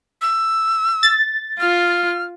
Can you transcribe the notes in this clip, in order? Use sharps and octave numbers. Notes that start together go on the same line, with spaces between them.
E6
A6
F4 F6